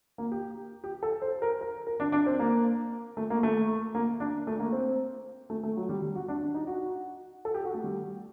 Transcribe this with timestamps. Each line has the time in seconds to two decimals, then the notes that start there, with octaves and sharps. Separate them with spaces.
0.18 A#3
0.32 G4
0.84 G4
1.03 A4
1.22 C5
1.42 A#4
1.61 A#4
1.87 A#4
2.00 D4
2.12 D4
2.26 C4
2.40 A#3
3.17 A3
3.30 A#3
3.43 A3
3.95 A#3
4.20 D4
4.47 A3
4.60 A#3
4.72 C4
5.50 A3
5.63 A3
5.77 F#3
5.89 G3
6.02 G3
6.15 F#4
6.28 D4
6.41 D4
6.54 D#4
6.67 F#4
7.45 A4
7.54 G4
7.65 F#4
7.74 A3
7.84 G3